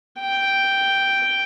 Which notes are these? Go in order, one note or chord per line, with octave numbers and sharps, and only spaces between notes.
G5